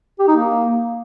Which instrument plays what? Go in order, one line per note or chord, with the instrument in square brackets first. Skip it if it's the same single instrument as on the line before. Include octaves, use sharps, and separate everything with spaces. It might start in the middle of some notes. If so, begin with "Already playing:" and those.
[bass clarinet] G4
D#4
A#3